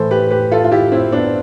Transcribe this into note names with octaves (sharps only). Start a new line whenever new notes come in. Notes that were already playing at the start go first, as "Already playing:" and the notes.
Already playing: A2 E3 A4 C5
G4 B4
G4 B4
F4 A4
F4
E4 G4
C4 E4
B3 D4